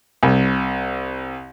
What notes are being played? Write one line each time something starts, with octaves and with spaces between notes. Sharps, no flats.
C2